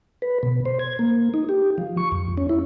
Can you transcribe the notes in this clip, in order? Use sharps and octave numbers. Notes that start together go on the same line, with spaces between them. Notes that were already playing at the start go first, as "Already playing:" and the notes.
B4
B2
C5
G#6
A#3
D#4
G4
F3
C#6
F2
C#4
E4